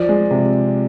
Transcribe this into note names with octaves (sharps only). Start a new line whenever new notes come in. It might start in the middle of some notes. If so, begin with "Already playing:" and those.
Already playing: F3 D5
G#3
C3